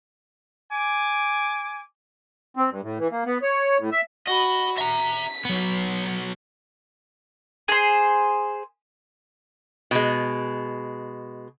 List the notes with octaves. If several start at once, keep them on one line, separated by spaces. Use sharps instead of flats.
G#5 D6
C4
G2
A2
E3
A#3
B3
C#5
A2
E5
F#4 D#5 B5
E5 A#5 B6
F#3 B3
G#4 C5
B2 G#3